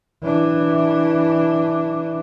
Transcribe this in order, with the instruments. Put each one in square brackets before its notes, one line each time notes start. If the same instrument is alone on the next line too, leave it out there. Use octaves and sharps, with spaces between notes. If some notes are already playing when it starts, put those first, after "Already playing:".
[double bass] E3 D4